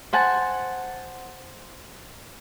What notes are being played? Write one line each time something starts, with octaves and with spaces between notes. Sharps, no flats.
C5 F#5 G#5 A5